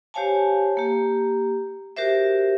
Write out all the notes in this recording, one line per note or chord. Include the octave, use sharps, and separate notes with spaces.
G4 C5 C#5 F5 G#5 A5
A#3 G4
F#4 G4 A#4 C5 E5